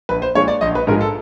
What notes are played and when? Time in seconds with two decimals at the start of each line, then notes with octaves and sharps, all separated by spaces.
0.09 A#1 B4
0.22 C5
0.35 A#2 F3 G#3 C#5
0.48 D5
0.61 A#1 D#5
0.75 B4
0.87 G#2 F3 G#3 A#4
1.01 A4